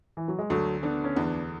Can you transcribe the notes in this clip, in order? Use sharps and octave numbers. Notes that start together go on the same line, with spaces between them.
E3
F#3
G#3
D2 F#3 A3
D3 B3 D4
C#4
E2 B3 D4